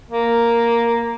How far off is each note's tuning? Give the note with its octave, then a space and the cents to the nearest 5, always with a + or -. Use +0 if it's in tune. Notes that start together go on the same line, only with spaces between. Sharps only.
A#3 +0